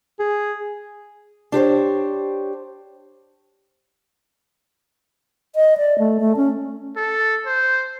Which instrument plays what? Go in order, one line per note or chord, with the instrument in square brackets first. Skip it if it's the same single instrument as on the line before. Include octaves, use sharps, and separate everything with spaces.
[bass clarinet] G#4
[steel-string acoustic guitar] D4 G4 C5 C#5
[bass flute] D#5
D5
A3
A3
C#4
[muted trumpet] A4
C5